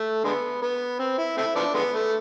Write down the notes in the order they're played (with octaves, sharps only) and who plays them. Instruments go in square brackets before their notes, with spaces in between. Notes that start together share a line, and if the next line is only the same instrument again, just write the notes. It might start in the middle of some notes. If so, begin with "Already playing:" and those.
Already playing: [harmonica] A3
D3 G#3 B3
B3
C4
E4
A3 C4 E4
F3 B3 D4
D3 G#3 B3
A3